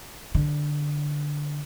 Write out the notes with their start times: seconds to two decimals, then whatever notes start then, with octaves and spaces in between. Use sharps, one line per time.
0.35 D3